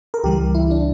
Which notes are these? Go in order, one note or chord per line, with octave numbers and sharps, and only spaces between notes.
A#4
C#2 C#3 E3 G3 G4
E4
D4